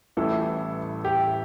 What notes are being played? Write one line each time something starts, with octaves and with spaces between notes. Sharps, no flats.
A1 A2 E3 G3 A4
G4